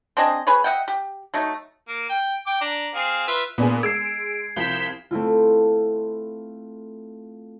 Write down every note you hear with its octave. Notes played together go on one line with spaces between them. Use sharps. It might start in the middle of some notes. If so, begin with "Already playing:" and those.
C4 D4 G#4 D#5
G#4 B4 C#5
D#5 E5 F#5 G5
G4
F#3 A3 D#4
A#3
G5
G5 D6
D4 A#5
C4 G#4 F5
F4 B4 E5
A#2 B3 D4 G#4
G#3 E6 G#6 C7 D7
C2 F3 G6 B6 E7
A3 C4 E4 F4